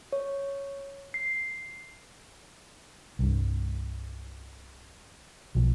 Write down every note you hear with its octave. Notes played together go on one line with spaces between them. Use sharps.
C#5
C7
C2 G2
B1 B2 F3